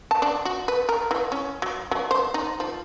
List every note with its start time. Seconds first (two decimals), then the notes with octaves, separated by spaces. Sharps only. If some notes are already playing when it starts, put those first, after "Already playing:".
0.11 A5
0.22 D4
0.45 F#4
0.68 B4
0.89 A#4
1.11 E3
1.32 C#4
1.62 F#3
1.91 F#3
2.11 C5
2.34 D#4
2.60 F3